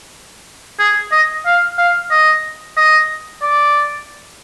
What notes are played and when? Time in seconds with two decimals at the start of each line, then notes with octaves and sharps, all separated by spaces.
0.79 G#4
1.12 D#5
1.46 F5
1.78 F5
2.11 D#5
2.77 D#5
3.42 D5